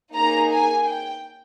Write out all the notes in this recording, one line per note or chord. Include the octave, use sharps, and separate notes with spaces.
A#3 D#4 G#4 A#5
G#5
G5